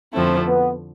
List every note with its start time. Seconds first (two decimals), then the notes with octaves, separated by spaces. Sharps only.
0.14 F2 D3 F3 A3 C4 E4
0.47 B3